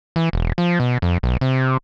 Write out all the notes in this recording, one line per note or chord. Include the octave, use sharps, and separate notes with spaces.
E3
E1
F3
B2
F2
B1
C3